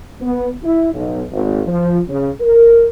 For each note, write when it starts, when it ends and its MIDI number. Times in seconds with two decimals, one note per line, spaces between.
0.21 0.51 59
0.64 0.93 64
0.94 1.21 35
1.32 1.62 32
1.67 1.99 53
2.09 2.28 49
2.41 2.86 70